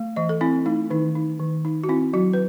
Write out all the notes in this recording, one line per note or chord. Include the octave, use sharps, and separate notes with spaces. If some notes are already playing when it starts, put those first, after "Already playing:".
Already playing: A3
E3 D#5
A4
C4 E4
A3 D#4
D#3 D#4
D#4
D#3
D#4
F#4
C4 E4
F#3 F#4
B4